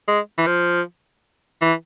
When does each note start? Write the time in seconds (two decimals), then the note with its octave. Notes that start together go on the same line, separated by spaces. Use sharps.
0.08 G#3
0.38 E3
0.47 F3
1.61 E3